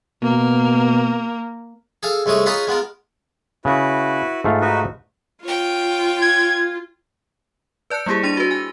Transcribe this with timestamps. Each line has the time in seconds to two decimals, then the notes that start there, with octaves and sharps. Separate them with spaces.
0.23 B2 A#3
2.03 G#4 A4 F5
2.26 C2 G#3 A3 C#5 D#5
2.46 F4 G#4 B4 C#5 D#5 A#5
2.67 G#3 B3 F4 A#4
3.65 C#3 E4 F#4 B4
4.44 G#2 A3 F4
4.61 D#4 F#4 B4
5.44 F4 C#5 G5
6.22 G#6
7.90 B4 D5 A5 F#6 C#7
8.06 G3 A#3 E4 G4 G#4
8.23 D4 C6 A6 A#6 D#7
8.37 F#4 B4
8.51 G#5